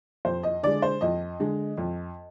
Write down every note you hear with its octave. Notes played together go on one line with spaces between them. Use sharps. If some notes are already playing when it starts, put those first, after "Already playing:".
F2 C5
D#5
D3 G#3 D5
C5
F2 D#5
D3 G#3
F2